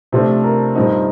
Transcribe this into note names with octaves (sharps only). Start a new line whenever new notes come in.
C3 F3 A3 D4 A4
A#4
G2 F3 C4 D#4